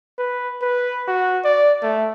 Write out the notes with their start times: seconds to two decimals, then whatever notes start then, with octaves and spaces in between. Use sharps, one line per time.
0.18 B4
0.62 B4
1.08 F#4
1.44 D5
1.82 A3